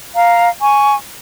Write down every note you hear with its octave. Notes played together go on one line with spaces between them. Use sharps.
F5 A#5
G#5 C#6